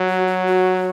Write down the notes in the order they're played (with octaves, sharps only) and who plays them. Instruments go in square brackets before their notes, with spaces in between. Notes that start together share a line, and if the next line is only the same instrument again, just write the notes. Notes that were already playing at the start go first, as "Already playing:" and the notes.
Already playing: [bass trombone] F#3
[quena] F#4
F#4
F#4